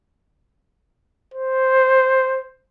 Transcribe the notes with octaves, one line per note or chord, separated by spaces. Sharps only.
C5